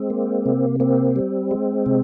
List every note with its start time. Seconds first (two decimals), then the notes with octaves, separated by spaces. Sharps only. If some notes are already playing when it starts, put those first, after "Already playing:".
Already playing: G#3 C4
0.10 A#3
0.46 C3
0.80 A#3 C4
1.16 G3
1.51 G#3
1.86 C3